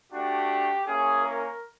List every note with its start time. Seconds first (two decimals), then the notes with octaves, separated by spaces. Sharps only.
0.13 A3 D4 F#4 G4
0.86 A#3 C#4 E4 G#4
1.24 A#4